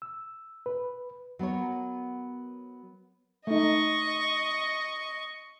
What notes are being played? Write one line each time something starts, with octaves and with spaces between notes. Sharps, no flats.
E6
B4
F#3 B3 A#4 C#5
A3 D#4 D#5 C#6